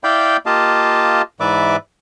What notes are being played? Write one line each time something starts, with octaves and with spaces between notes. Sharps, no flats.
E4 D5 F5 G5 B5 G6
A#3 F4 G4 D#5 F5 A5
G#2 E3 B4 D5 E5 D6